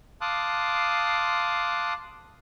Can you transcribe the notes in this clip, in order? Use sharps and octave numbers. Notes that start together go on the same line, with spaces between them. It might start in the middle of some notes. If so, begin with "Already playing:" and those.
F5 A5 C6 D6 D#6 F#6